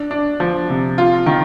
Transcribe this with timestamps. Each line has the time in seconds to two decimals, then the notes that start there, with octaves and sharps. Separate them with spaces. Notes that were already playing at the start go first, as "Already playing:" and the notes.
Already playing: D4
0.11 D4
0.40 F3
0.70 C3
0.98 F4
1.26 D#3